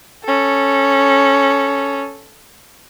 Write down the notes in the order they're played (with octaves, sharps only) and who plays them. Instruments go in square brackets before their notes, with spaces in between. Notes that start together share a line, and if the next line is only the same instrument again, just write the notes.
[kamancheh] C#4 A4